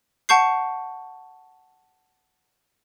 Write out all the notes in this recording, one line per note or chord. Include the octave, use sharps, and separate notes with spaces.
F#5 A5 C#6 G6 C7